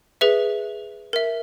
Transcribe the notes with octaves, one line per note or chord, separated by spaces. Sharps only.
G#4 B4 E5
A#4 E5